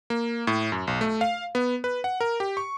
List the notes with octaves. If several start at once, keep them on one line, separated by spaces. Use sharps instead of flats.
A#3
A2
F#2
B1
A3
F5
B3
B4
F#5
A#4
G4
C#6